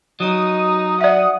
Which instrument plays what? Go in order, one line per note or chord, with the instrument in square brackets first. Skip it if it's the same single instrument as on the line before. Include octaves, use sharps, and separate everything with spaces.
[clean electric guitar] F#3 [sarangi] D#4 [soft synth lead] D#6
[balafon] D5 E5 [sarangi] F#5